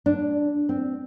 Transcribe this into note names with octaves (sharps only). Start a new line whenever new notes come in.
D4
C4